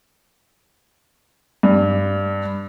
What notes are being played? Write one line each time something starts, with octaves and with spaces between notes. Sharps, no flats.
G2